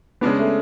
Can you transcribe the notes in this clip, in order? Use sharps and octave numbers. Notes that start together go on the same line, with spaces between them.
C#3 G#3 B3 D4
A3